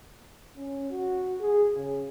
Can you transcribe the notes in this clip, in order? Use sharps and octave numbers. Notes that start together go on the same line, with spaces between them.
C#4
F#4
G#4
C#3